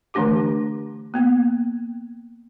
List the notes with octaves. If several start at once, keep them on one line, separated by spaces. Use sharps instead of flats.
D3 E3 A3 D4 G4 D6
A#3 B3 G5